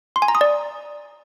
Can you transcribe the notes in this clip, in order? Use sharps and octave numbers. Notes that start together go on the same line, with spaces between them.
C6
G#5
A#5
D#6
D5